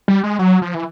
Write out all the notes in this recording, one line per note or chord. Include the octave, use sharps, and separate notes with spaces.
G3
G#3
F#3
F3
E3